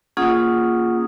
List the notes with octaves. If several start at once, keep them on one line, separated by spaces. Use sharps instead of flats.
A#3 C#4 F4 G#4 F#5 D#6